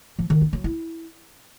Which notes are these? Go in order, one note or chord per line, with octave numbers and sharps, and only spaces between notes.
F3
D#3
D4
F#3
E4